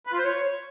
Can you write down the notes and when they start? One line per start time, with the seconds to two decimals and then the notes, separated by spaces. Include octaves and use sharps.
0.07 B4
0.13 F4
0.19 C5
0.25 C#5